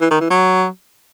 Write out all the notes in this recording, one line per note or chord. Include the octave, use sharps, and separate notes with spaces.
E3
D#3
E3
F#3